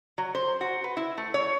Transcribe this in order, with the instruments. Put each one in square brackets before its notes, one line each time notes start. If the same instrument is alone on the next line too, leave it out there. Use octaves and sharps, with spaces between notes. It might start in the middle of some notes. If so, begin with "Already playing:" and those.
[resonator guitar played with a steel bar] F#3
C5
F#4
B4
E4
A3
C#5